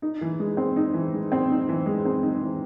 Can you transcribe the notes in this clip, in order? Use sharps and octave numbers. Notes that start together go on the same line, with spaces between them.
D#4
E3
G#3
C4
D#4
E3
G#3
C4
D#4
E3
G#3
C4
D#4
E3